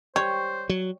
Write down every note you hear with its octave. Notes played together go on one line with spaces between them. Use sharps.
G3 C5 C#5
F#3